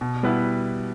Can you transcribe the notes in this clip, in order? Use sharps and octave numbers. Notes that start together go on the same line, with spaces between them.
B2
G3 B3 E4 B4